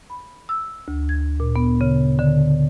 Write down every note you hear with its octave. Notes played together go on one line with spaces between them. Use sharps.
B5
E6
D2
G#6
A#2
B3
C#3
D3